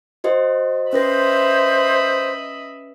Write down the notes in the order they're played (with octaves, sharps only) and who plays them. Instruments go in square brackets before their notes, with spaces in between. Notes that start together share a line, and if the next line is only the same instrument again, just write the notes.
[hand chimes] F#4 C5 D#5
[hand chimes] C#4 B4 A#6 [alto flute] C5 [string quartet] D#5 E5 B5